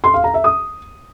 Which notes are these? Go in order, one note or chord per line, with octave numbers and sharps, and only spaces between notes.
C6
F5
A#5
E5
D#6